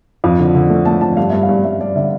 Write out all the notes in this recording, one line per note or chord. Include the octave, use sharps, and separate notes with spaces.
F2 F5
D3
D3
A3
A3 A5
F2 A5
G2 F5
G2 E5
F5
G2
G2 E5
G2 D5
D3 E5